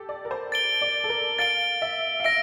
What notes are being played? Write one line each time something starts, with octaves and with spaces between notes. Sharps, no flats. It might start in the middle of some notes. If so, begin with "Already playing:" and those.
Already playing: G4 A4
D5
A#4
C5
A6 D7 G7
D5
A4
A#4
F5 A6 D7 G7
E5
F5
E5 A#6 D7